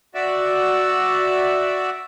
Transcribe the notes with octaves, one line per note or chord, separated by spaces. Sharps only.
F#4 D5 E5